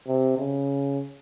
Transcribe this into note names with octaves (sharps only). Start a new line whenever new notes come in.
C3
C#3